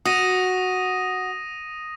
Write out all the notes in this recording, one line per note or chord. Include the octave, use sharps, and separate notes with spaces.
F#4 D#6 A#6 D#7